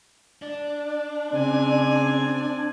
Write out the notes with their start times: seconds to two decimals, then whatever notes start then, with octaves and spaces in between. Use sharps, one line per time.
0.42 D4
1.33 C#3 C4 G#5